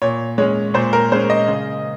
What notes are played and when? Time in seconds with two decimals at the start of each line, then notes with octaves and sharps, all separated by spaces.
0.02 A#2 C#5
0.38 G#3 C#4 C#5
0.74 A#2 C5
0.93 A#4
1.12 G#3 C#4 C5
1.30 D#5
1.48 C#3